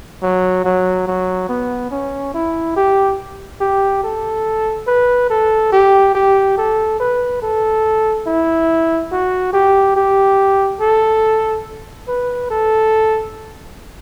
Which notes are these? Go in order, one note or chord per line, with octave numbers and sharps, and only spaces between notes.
F#3
F#3
F#3
B3
C#4
E4
G4
G4
A4
B4
A4
G4
G4
A4
B4
A4
E4
F#4
G4
G4
A4
B4
A4